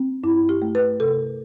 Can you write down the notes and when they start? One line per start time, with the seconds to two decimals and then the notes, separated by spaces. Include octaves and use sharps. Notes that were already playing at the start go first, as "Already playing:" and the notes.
Already playing: C4
0.24 G2 E4
0.49 G4
0.62 A3
0.75 B4
1.00 C3 A4